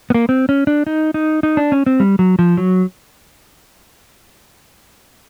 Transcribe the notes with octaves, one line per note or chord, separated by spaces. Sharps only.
B3
A#3
C4
C#4
D4
D#4
D#4
D#4
D4
C#4
C4
G3
F#3
F3
F#3